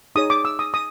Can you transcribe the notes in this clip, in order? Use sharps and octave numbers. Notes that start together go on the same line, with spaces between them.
D#4 G#4 C#5 D#6
D6
E6
D#6
D#6